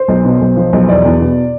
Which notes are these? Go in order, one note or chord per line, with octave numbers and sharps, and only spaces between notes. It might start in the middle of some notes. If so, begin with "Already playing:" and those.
Already playing: C5
B1
B2
B1
F3
B1
E2 D5
E2
B2